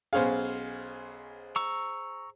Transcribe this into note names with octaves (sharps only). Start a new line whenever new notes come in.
B1 C#4 G#4 C5 F5
A#5 C#6 E6